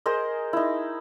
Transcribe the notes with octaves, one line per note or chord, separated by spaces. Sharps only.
G#4 A#4 C5 D#5
D#4 E4